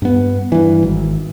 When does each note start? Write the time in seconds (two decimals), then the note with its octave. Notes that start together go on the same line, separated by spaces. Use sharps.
0.02 G2 B3
0.52 G2 E3
0.83 G#1